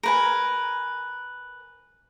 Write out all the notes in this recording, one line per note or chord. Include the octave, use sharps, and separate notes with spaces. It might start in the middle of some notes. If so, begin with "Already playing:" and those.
A#4 B4 G#5